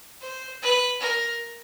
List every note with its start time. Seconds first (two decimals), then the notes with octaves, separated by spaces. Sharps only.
0.21 C5
0.62 B4
1.01 A#4